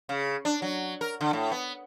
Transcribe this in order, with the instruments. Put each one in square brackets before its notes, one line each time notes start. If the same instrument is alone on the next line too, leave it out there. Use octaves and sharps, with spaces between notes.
[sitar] C#3
D4
F#3
A#4
D3
A2
B3